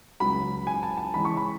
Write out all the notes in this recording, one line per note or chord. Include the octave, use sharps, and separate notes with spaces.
C#2 C#3 F#3 B5
G#5
A5
A5
C#3 E3 G#3 C#4 B5
C#6
B5